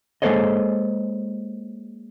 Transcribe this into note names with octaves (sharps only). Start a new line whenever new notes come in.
G#3 A#3 A4 C5 C#5 D#5